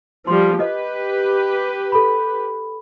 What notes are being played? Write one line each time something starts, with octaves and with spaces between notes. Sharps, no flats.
F3 G3 C6
G4 B4 D#5
A4 B5